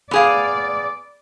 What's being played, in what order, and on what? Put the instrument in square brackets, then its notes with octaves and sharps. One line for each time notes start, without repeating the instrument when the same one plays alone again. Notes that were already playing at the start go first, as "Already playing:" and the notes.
[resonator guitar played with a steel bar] B3 G#4 F5 [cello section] D5